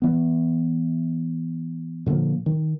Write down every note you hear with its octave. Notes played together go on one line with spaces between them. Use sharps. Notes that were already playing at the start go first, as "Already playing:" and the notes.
E3 B3
A#2 D3 F3 A#3
D#3